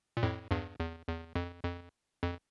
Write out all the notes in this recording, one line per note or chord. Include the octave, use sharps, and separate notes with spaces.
A#2
F2 A2
E2 G2
E2
E2
F2
F2
F2